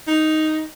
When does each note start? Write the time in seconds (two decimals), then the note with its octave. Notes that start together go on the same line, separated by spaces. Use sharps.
0.07 D#4